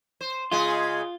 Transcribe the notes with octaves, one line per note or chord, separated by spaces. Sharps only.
C5
C#3 G#3 F4 G#4